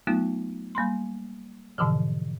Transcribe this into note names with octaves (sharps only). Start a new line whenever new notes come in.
F#3 A3 B3 D#4 F4
G3 A#3 B5 C6
G#2 B2 D3 E3 F3